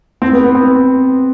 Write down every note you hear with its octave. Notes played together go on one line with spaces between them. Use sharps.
C4
B3
B3
C4